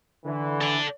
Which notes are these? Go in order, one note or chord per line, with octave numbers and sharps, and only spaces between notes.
D3 E3
A4 D5